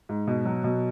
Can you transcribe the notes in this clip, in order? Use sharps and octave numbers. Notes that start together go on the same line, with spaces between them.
G#2
B2
F#3
B2